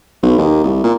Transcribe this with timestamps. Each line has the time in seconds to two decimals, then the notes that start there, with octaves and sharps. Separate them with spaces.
0.23 B1
0.38 D#2
0.64 C2
0.84 A#2